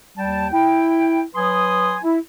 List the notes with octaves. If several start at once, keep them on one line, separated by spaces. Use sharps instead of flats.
D#2 G3 G5 A5
E4 G5
F#3 B4 G#5 C6 D#6
E4